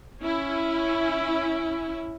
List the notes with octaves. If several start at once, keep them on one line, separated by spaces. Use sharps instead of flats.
C#4 E4